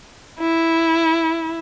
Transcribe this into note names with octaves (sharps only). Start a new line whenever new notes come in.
E4